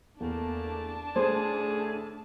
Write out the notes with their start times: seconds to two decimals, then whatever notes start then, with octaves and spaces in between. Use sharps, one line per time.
0.20 E2 A3 A#3 D4 A5
1.16 A2 D3 A3 G#4 C5